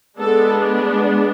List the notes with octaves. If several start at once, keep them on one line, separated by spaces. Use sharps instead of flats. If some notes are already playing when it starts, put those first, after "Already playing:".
G#3 B3 D4 A4